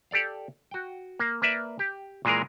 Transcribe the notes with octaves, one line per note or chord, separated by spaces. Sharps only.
G4 A4 D5 F5
F#4 G5
A#3
A#3 B4 D5 E5
G4
A#2 E3 G#3 G#4 A#4